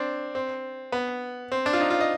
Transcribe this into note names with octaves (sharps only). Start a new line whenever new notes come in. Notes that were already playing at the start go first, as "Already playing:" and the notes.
Already playing: C4 D4
C4
B3
C4
D4
F4
D#4
F4
D#5